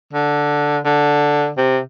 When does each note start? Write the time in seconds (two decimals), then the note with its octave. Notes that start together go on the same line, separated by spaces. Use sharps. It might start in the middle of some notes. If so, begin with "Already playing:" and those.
0.13 D3
0.85 D3
1.57 C3